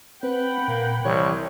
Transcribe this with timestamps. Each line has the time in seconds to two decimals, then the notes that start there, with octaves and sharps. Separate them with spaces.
0.23 C4 B4 F#5 G5 B5
0.68 A#2 A#3
1.05 C2 E3 C#5